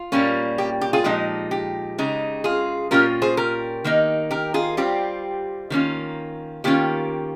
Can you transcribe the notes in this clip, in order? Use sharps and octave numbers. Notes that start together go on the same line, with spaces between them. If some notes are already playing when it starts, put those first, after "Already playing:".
Already playing: F4
A#2 G3 A#3 C#4
G4
G4
F4 G#4
A#2 F3 G#3 D#4 G4
G4
C#3 G#3 D#4
F4 G#4
A#2 G3 C#4 F4 G4 A#4
G#4 C5
G4 A#4
D#3 A#3 D#4
G4 A#4
F4 G#4
G3 C4 F4 G4
D#3 A#3 C#4 F4
D#3 A#3 C#4 F4 G4